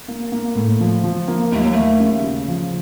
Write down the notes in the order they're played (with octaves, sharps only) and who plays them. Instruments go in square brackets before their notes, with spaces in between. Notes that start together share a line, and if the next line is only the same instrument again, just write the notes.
[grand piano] A#3
A#3
A2
F3
F3
A#3
[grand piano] D#2 [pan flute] A3
[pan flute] F#3
A3
[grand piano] D#2
C#3
C#3
F3